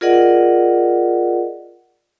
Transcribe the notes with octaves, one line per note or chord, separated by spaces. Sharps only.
F4 G#4 A#4 D5 D#5 F#5